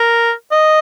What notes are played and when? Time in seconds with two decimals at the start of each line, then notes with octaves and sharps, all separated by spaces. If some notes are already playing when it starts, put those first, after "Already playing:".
Already playing: A#4
0.52 D#5